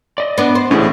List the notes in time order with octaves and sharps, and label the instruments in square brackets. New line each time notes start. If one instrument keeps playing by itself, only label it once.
[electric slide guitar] D5 D#5
[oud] B3 D4
C5
[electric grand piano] A1 A2 [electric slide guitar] C#4 G#4